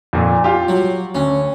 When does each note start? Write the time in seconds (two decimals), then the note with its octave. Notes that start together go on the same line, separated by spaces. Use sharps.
0.13 F2 A#2
0.44 F4 G4
0.68 F#3
1.15 D2 C#4